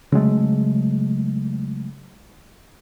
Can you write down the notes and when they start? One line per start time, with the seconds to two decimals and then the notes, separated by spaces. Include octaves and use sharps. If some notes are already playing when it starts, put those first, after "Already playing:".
0.12 C#3 F#3 G#3 A3